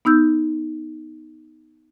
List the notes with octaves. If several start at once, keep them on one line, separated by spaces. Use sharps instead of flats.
B3 D#4 E6 G6